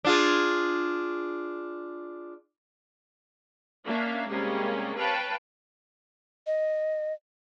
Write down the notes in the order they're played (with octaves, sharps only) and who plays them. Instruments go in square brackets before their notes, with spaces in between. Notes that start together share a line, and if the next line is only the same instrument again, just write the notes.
[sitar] D4 F4 G#4
[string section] A#3 C#4 D4 E5 F5
C3 G3 G#3 A#3 C#4
B4 C#5 F5 G5 A5
[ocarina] D#5